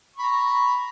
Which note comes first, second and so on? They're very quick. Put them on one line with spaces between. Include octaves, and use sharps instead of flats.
C#6 B5 A#5